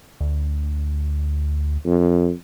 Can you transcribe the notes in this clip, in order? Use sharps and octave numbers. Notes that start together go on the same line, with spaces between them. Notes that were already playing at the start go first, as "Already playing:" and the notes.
D2
F2